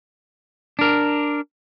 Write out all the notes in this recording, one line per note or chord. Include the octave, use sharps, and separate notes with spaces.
D4 A#4